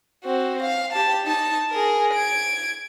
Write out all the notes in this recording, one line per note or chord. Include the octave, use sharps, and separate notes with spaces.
C4 F#4
F5
G4 A5
D#4 A5
G#4 A#4
G#6 D7